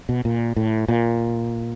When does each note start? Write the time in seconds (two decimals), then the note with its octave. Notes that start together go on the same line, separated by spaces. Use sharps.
0.09 B2
0.25 A#2
0.56 A2
0.88 A#2